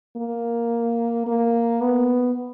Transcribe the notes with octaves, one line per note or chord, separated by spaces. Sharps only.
A#3
A#3
B3